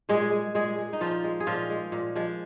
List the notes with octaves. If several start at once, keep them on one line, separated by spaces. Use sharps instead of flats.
A#2 G#3 G#4
G#3
A#2 G#3 G#4
G#3
D#4
A#2 F3 F4
G#3
G#4
A#2 F3 F4
G#3
A#2
F3 G#3